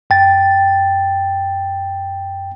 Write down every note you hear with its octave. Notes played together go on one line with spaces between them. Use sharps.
F#2 G5 A6